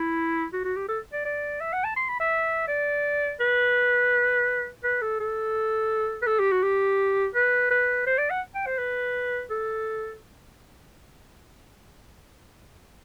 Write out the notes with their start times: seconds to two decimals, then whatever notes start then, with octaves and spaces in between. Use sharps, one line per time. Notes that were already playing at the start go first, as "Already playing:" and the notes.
Already playing: E4
0.53 F#4
0.64 F#4
0.76 G4
0.89 A4
1.13 D5
1.25 D5
1.61 E5
1.73 F#5
1.84 A5
1.96 C6
2.09 B5
2.20 E5
2.68 D5
3.40 B4
4.84 B4
5.02 A4
5.20 A4
6.22 B4
6.27 A4
6.39 G4
6.52 F#4
6.63 G4
7.35 B4
7.71 B4
8.07 C5
8.18 D5
8.30 F#5
8.55 G5
8.66 C5
8.78 B4
9.50 A4